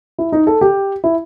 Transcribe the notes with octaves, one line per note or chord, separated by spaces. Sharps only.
E4
D#4
A4
G4
E4